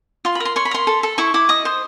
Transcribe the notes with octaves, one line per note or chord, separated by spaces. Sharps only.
F4 C6
B5
A#4
C6
C#5 C6
B5
A#4 C6
A4
A4
E4 C#6
E4 D6
D#5 D#6
C5